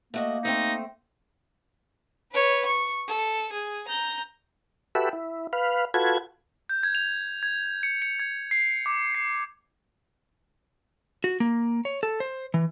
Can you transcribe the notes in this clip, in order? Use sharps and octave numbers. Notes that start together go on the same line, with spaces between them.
A3 A#3 F#4 D#5
A3 C4 D#4
B4 C#5
C#6
A4
G#4
A#5 G6
F#4 G4 A4 B4 E5
E4
B4 F5
F4 F#4 A4 B4 G#6
G6
G#6
F7
G#6
C#7
C#7
G#6
C7
D6
C7
F#4
A#3
C#5
A4
C5
E3